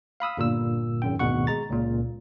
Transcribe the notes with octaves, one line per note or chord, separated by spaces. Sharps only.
F5 B5 D#6 E6
G1 A#2 E6
G#1 F#2 G5
G#1 D2 B2 F#5 C#6
G#3 A#5 A6
C#2 A#2